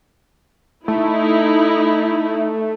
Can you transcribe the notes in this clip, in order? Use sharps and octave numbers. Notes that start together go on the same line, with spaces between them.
A3 D#4 E4